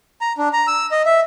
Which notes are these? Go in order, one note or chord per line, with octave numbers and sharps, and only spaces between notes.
A#5
D4
A#5
E6
D#5
E5